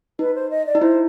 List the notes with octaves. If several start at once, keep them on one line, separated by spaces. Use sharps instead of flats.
D#4 B4
C5
D#5
D5
D#4
E4 C5